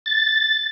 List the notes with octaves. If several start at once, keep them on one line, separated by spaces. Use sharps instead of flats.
A6